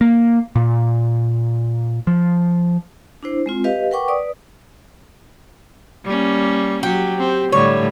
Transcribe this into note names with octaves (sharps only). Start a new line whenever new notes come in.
A#3
A#2
F3
D4 E4 C5
G#3 C4 F4
G4 B4 D#5 F5
A#4 B4 F#5 G5 C#6 D6
B4 D5 D#6
G3 A#3 C#4
F#3 G4
C4
A2 D3 G3 C#5